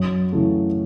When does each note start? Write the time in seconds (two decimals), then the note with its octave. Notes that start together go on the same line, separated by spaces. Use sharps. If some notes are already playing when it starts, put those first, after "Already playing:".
Already playing: F#2
0.33 C#3 E3 A3